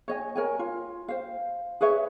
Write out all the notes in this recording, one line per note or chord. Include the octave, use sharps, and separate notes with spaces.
C#5 D#5 G#5
A#4 C#5 G#5
F4
C5 F5
G#4 B4 C#5 E5